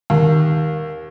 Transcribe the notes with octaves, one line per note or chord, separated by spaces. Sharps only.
D#2